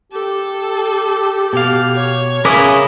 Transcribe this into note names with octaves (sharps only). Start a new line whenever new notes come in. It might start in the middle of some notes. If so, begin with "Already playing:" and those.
G4 A4
B2 F5
C#5
C#3 C#4 E4 A#4 B4 D6 D#6